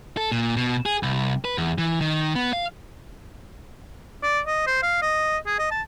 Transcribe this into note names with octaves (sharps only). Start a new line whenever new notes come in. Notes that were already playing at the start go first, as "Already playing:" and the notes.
A4
A#2
B2
G#4
C2
B4
E2
E3
D#3
B3
F5
D5
D#5
C5
F5
D#5
G#4
D#5
A5